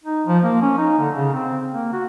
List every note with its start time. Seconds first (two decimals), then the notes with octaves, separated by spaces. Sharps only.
0.04 D#4
0.27 F3
0.43 A#3
0.62 C#4
0.78 D#4
0.99 D3
1.15 C#3
1.34 C4
1.73 A#3
1.93 F#4